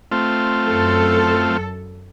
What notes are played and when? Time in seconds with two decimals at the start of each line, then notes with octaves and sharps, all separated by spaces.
0.12 A3 C4 F4
0.64 F#2 A4